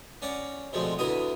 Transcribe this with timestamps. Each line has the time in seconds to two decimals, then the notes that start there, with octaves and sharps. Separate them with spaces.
0.22 C#4 D5 F#5 A#5
0.73 B2 D3 F3 G#3 A3 C4
0.99 D2 D3 B3 E4 A#5 D#6